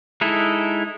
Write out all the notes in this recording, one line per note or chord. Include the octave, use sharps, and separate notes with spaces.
G#3 D#4 E4 A4